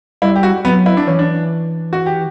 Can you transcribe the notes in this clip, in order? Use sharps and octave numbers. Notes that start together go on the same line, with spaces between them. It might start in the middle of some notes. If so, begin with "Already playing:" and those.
G3 E4
G4
F#4
F#3 B3
E4
D4
E3 C#4
D4
F#4
G4